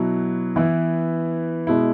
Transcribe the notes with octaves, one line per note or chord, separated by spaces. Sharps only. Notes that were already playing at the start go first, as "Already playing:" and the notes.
Already playing: B2 F#3 E4
E3 B3 E4
B2 G#3 E4